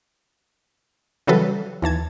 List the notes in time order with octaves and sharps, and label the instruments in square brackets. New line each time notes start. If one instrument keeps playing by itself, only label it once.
[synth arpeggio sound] C#3 E3 F#3 G3 A4 B4
D#2 E3 A5 G#6